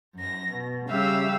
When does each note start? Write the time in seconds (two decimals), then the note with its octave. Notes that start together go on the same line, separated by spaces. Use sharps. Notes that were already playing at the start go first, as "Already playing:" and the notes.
0.15 F#2 A#6
0.52 B2
0.89 C#3 G3 G4 E5 F5 E6